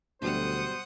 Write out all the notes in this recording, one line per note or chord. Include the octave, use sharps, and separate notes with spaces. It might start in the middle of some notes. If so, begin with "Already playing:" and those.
D2 B2 F#3 G3 C5 F#5 D#6